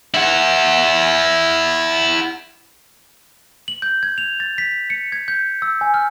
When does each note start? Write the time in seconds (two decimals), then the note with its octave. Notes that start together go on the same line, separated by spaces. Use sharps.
0.14 E4 F#5
3.68 F#7
3.82 G6
4.03 G#6
4.18 F7
4.40 A6
4.58 B6
4.90 C#7
5.12 G#6
5.28 G6
5.62 E6
5.81 G#5
5.94 F6